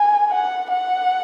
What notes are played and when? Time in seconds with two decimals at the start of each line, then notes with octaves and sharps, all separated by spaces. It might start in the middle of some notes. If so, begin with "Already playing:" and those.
Already playing: G#5
0.31 F#5
0.70 F#5